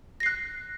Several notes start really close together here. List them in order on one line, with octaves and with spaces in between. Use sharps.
A#6 C7 F#6